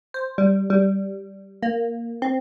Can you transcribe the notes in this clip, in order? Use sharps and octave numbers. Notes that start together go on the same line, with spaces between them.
C5
G3
G3
A#3
C4